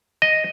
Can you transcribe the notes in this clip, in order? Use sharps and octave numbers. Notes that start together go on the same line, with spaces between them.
D#5